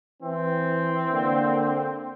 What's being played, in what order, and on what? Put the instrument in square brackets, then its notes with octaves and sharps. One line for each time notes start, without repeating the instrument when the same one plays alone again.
[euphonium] E3 [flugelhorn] C4
[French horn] D3 [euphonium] A#3